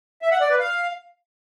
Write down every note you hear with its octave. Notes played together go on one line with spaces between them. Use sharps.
E5
F#5
D5
B4
F5